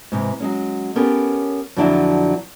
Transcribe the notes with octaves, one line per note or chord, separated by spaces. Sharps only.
G#2 C3 E3
F#3 G#3 C#4
B3 C#4 G4 A4 A#4 C#5
F2 D3 F3 F#3 D4 E4